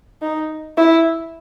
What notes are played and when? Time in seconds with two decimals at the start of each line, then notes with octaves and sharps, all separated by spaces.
0.22 D#4
0.77 E4